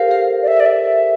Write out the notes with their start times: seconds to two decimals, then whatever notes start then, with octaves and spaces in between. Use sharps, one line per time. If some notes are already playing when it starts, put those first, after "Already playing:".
Already playing: G4 A4 A#4 C5 F5
0.11 G4 A#4
0.43 D5
0.47 E5
0.60 D5
0.66 E5